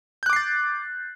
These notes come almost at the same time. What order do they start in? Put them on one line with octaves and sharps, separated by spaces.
G6 F#6 D6 C7 A6